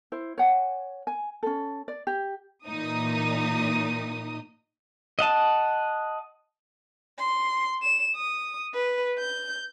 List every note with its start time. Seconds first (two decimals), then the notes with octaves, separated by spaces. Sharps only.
0.12 E4 C5
0.38 C#5 F#5 G#5
1.07 G#5
1.43 C#4 A4
1.88 D5
2.07 G4
2.66 A#2 E3 D#4 D#6
5.19 D#5 F#5 A5
7.19 C6
7.82 E7
8.15 D#6
8.74 B4
9.19 G6